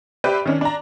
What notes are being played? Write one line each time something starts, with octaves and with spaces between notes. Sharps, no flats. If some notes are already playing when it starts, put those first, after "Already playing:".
G4 B4 C5 D5 E5
D#3 C#4 D4
D4 A#5